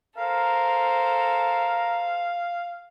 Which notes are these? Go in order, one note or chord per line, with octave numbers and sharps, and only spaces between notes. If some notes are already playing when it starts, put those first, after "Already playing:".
A4 A#4 C5 F5